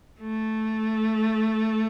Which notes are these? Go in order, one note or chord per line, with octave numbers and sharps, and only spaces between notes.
A3